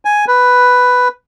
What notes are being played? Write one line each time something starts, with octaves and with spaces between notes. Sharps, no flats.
G#5
B4